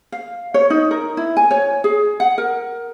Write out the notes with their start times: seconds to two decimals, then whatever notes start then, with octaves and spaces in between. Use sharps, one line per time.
0.12 F5
0.54 C#5
0.70 D#4
0.91 A#4
1.17 E4
1.37 G#5
1.51 C#5
1.84 G#4
2.20 F#5
2.38 A#4